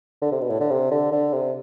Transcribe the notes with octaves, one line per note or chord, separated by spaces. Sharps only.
D3
C3
B2
A2
D3
C3
D3
D3
C3